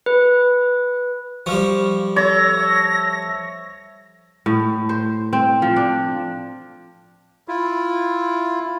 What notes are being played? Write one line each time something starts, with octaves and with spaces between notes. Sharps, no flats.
B4
F3 G3 F5 C#6
A4 C#5 E5 A#6
A2
C5
C4
F3
D4
E4 F4